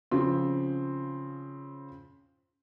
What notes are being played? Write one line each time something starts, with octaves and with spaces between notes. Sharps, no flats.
C#3 F3 C4